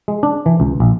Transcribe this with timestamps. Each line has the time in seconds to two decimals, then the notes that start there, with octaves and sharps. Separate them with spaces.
0.08 G#3
0.23 D4
0.46 E3
0.60 C#2
0.80 A#1